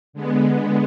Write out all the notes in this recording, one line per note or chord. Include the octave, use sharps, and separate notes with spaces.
D3 G#3 B3